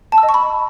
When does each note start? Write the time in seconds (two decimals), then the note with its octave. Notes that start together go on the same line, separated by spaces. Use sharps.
0.12 A5
0.18 E6
0.23 D#5
0.29 C#6
0.34 B5